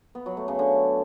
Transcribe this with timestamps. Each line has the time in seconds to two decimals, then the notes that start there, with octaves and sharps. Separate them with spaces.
0.15 B3
0.26 F#3
0.37 A3
0.48 C#3
0.59 D3